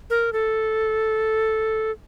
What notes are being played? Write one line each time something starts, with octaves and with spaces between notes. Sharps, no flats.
A#4
A4